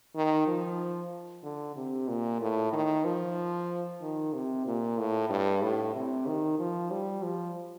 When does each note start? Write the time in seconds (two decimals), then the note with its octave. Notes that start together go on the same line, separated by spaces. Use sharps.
0.16 D#3
0.47 F3
1.43 D3
1.76 C3
2.08 A#2
2.41 A2
2.73 D#3
3.05 F3
4.01 D#3
4.33 C3
4.66 A#2
4.98 A2
5.30 G2
5.62 A2
5.95 C3
6.26 D#3
6.59 F3
6.91 G3
7.23 F3